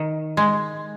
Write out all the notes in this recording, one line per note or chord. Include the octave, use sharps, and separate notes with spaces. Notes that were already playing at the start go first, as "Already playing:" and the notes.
Already playing: D#3
G#3